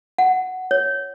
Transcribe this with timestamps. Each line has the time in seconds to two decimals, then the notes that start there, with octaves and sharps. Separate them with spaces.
0.18 F#5
0.71 C#5